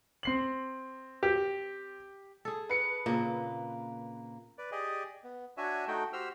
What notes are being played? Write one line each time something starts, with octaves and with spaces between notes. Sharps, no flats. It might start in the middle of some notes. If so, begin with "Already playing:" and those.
C4 C7 F#7
G4
G#4 A4
B4 C#7
A#2 C#3 A#3 C4
B4 D5
G4 G#4 D5 D#5
B3
D4 F#4 C#5 E5 G#5
A3 D#4 F#4 G5
F#4 G4 C5 E6 F6